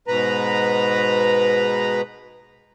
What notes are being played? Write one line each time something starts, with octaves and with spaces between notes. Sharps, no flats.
G#2 B2 B4 A#5